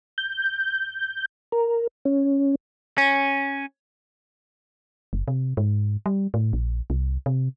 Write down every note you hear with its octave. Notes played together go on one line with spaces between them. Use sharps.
G6
A#4
C#4
C#4
F#1
C3
G#2
G3
A2
A#1
C2
C3